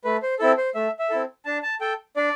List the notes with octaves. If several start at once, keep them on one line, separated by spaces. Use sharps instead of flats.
A3 B4
C5
C4 E4 A4
C5
A3 E5
E5
C4 E4 A4
D4 A5
A5
A4 G5
D4 D5